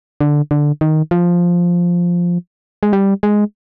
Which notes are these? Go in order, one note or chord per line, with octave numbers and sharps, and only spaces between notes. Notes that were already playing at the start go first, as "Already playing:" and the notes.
D3
D3
D#3
F3
G#3
G3
G#3